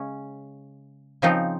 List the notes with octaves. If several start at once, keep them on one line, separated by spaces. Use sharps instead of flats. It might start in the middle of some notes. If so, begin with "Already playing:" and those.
Already playing: C#3 G#3 C#4
C#3 F3 C4 D#4